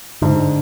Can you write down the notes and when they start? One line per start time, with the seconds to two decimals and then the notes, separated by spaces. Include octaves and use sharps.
0.22 G#2 D3